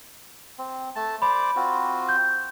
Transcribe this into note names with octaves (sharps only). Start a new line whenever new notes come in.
C4
A3 A5
C5 D5 B5 D6
C4 F4 F#4
G6